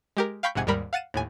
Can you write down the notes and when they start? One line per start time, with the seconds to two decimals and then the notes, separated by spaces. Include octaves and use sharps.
0.17 G#3 G4 A#4
0.43 F5 G5 B5 C#6 G6 B6
0.55 A#1 G#2 C3 F#5 G#5 G#6
0.67 D#2 G#2 G3 A#4 B5
0.93 F5 F#5 A6 D#7 E7
1.14 D#2 A2 G#5